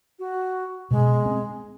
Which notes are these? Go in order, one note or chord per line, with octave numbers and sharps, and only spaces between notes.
F#4
B2 G#3
C4